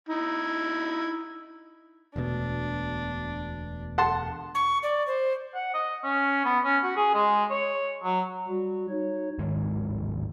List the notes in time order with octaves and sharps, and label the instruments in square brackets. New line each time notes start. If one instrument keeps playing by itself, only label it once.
[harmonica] D#4 E4
[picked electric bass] E1 D2 B2 [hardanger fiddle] D4
[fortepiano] F#5 A5 C6
[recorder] C#6
D5
C5
[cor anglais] F#5
D#5
C#4
B3
C#4
F#4
G#4
G#3
C#5
F#3
[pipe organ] G3 F#4
D#4 C#5
[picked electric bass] D1 G#2 D#3 G#3